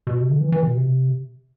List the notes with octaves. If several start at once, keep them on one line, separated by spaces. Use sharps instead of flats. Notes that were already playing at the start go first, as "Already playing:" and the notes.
B2
C3
D3
E3
E3
B2
C3